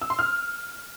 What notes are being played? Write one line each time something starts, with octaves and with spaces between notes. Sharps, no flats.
E6
C6
F6